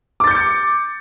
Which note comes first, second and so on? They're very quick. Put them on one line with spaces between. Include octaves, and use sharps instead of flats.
D6 A6 G6 C#7